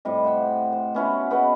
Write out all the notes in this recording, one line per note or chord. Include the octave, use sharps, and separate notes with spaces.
A2 C3 G3 D#5
C5 F#5 G5
C5
B3 C#4 E4 F#4
B3 G#4 B4 D#5